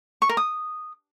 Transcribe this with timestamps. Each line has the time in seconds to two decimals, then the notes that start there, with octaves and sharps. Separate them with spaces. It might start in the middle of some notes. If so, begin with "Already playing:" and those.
0.22 C#6
0.29 A#4
0.37 D#6